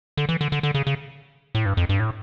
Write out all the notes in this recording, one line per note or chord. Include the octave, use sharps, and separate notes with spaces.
D3
E3
D3
D3
D3
C#3
C#3
A2
G2
F2
G2
A2